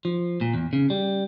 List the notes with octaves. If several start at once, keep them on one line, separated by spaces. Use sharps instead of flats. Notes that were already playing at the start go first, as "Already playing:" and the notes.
F3
A#2
E2
C#3
G3